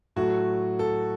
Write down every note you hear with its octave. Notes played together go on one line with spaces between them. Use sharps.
A2 F#3 A3 F#4
A4